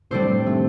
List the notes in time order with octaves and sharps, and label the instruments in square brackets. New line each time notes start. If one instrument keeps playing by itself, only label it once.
[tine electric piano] A2 C3 [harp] G3 D4 A4 C5
[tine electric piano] C3 D#3 [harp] A3